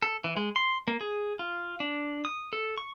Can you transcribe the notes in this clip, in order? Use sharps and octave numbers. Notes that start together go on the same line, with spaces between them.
A4
E3
G#3
C6
A#3
G#4
F4
D4
D#6
A4
C#6